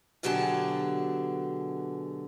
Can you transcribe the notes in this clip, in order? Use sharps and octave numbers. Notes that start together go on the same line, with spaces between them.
B2 D3 F#3 G4 G#4 A5